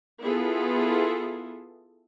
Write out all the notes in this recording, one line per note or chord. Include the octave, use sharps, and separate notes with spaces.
B3 E4 F4 G#4 A4